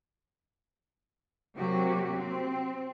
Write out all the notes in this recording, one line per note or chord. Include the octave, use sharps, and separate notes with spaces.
C3 F#3 A#3 F#4 G4
C4